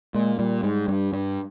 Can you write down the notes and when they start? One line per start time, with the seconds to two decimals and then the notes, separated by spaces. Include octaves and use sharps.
0.15 A#2 G#3
0.39 A#2 G3
0.63 G#2
0.88 G2
1.13 G2